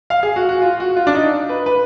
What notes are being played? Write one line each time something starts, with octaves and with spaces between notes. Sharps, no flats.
F5
G#4
F#4
F#4
F4
F#4
F4
D4
D#4
B4
B4